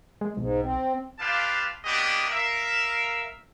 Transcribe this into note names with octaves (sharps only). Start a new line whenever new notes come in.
G#3
B1 G#2
C4
D4 F4 G4 B4 F5 A5
A#3 B3 D4 F#4 G4 D#5
A#4 E5 F5